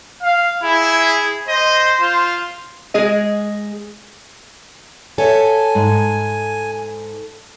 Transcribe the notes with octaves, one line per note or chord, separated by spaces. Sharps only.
F5
E4 G#4
C5 D#5
F4
G#3 G#4 D#5
A4 C#5 E5 G#5
G#2